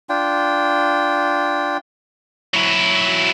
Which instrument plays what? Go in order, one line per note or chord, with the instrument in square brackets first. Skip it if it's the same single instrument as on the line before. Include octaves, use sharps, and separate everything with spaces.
[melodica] D4 F4 G5
[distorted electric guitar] F#3 E4